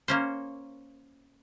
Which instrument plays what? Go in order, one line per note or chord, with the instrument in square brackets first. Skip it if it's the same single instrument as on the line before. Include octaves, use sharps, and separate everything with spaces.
[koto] A#3 C#4 C5